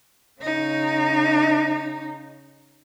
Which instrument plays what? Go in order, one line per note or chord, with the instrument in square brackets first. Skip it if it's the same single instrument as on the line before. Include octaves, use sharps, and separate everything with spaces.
[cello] C#3 D#4